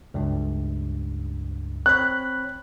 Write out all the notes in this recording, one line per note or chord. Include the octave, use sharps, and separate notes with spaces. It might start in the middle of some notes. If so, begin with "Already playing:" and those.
C#2 G2
C4 C#5 B5 F#6